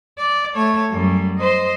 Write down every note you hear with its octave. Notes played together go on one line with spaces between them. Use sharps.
D5
A3 C#5
F#2 G3
C5 D#5